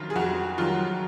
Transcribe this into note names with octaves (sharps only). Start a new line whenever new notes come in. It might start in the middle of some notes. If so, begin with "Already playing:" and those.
Already playing: F2 D#3 F#3 F4
G#4
F2 F#4
D#3 F#3 F4